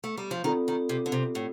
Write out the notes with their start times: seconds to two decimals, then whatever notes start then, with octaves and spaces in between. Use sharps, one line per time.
0.04 A3
0.17 G3
0.31 F3
0.44 D#3 C4 F4 A4 D5
0.68 D#3
0.89 C3
1.06 D3
1.12 C3
1.35 A2